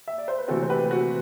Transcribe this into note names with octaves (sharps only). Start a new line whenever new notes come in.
E5
D5
C5
B4
C3 E3 A3 C4 F#4 A4
C5
G4 B4
F#4